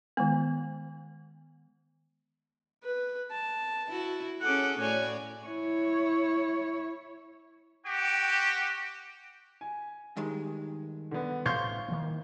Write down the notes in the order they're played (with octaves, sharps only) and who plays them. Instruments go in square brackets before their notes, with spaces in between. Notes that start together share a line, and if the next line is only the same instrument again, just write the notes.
[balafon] D#3 G#3 B3
[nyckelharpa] B4
A5
[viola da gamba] E4 F#4
[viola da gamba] C#4 G#4 A4 [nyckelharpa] F#5 D6
[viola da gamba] A2 C#5 D5 [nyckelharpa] F#4 G#5
[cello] E4 C#5
[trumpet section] F#4 G4 G5
[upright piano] G#5
[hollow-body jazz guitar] G2 D#3 G#3
[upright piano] D3 B3
[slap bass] A1 A2 [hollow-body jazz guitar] C5 F5 C6 [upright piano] C#6 G6
[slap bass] D#3 E3 A#3